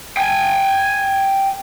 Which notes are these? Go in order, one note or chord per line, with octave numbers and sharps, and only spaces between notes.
G5 G#5